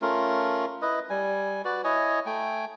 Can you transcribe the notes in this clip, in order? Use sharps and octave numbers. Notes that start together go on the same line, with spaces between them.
A3 C#4 F4 A#4
E4 B4 D#5
G3 G#5
F#4 B4 D5
E4 C#5 D#5 G#5
A3 G5 G#5